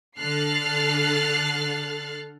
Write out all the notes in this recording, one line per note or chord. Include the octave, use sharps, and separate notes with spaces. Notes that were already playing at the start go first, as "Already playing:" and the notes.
D3 A4 F6 F#6 A6 C7